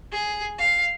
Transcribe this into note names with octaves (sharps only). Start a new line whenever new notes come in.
G#4
F5